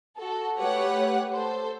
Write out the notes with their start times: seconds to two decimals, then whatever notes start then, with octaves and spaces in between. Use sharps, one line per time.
0.18 F#4 A4
0.58 A3 G4 B4 C#5 F#5
1.33 A4 C5